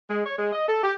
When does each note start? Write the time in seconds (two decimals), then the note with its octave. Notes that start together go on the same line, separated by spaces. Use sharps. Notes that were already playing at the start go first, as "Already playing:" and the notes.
0.10 G#3
0.26 C#5
0.38 G#3
0.52 D#5
0.68 A4
0.83 G4